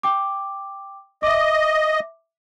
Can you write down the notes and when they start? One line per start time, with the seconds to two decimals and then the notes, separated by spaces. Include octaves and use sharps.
0.03 G5 D6
1.23 D#5 E5 D6